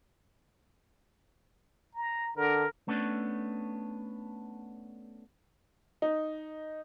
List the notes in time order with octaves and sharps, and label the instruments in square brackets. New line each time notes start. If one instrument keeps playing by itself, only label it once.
[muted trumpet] A#5
[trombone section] D3 [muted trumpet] A#4
[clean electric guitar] A3 B3 C#4 D4
[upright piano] D#4